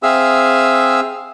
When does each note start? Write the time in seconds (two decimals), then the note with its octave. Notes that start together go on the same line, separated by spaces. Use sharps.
0.03 C4 G#4 E5 F5 E6